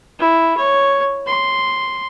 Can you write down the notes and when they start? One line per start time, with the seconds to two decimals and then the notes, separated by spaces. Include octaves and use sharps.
0.20 E4
0.57 C#5
1.27 C6